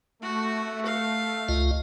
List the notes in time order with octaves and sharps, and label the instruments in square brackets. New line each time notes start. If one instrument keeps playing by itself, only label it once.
[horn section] A3 [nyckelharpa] F#4
[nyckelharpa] F5
[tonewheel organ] C#2 F4 D#5